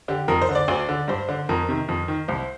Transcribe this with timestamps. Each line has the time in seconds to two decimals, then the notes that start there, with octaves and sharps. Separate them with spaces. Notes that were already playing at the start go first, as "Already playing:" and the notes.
0.08 D3 G4
0.28 F2 A#4
0.42 C5
0.49 D3
0.55 D5
0.68 D2
0.89 D3
1.08 G2 C5
1.29 D3
1.49 F2 A#4
1.69 C3 D#3
1.88 F2
2.08 D#3
2.28 C2 C5